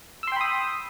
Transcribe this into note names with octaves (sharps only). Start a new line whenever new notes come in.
G5 B5 C6 D#6 E6